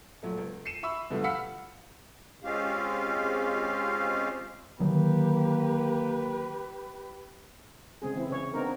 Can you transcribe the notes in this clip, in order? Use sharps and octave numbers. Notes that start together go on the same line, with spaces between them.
A#2 F#3 A3
C#2
C7 C#7 D#7 E7
E5 B5 C#6 E6
B2 D3 F3 G3 A3
F5 F#5 B5 E6 B6 C#7
G#3 C4 C#4 F4 G4 F5
D3 D#3 F#3 A#3 G4 B4
C#3 G#3 C4 G#4
E3 C4 E4
C#3 C#5
B3 C4 D4 D#4 A#4